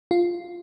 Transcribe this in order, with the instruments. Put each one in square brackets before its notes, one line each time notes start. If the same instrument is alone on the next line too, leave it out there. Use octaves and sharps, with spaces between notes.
[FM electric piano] F4